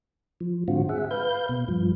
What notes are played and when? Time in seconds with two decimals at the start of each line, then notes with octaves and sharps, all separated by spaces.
0.41 F3
0.68 G#2 D3 C4 F4 F#4
0.89 G#4 E5 F#5
1.11 B4 F5 G6
1.49 B2
1.68 G2 F3